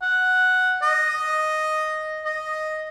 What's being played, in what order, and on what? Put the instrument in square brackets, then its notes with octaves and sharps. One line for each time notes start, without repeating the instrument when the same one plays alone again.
[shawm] F#5
D#5
D#5